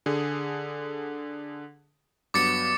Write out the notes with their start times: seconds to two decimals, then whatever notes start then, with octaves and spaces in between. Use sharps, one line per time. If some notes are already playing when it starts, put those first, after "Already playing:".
0.06 D3 G#4
2.34 G2 F#3 B3 D6 A6 C#7